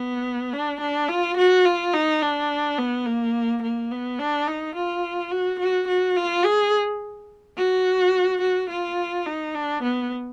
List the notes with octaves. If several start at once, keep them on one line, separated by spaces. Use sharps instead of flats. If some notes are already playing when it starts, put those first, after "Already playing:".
Already playing: B3
D4
D4
F4
F#4
F4
D#4
D4
B3
A#3
A#3
B3
D4
D#4
F4
F#4
F#4
F#4
F4
G#4
F#4
F#4
F4
D#4
D4
B3